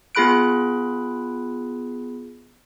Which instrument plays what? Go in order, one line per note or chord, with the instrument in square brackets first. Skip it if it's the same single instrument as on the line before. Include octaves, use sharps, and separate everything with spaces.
[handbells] B3 F4 G#4 B5 F#6 D7